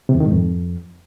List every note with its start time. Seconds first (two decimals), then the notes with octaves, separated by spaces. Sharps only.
0.09 C3
0.15 E2
0.20 D#3
0.26 G#2
0.32 F2